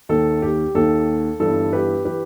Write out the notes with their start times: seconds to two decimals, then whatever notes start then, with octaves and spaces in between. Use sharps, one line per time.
0.09 D#2 D#3 A4
0.42 G4
0.75 D#2 D#3 A4
1.40 G1 G2 E3 A4
1.73 G4 B4
2.05 E3 G4 B4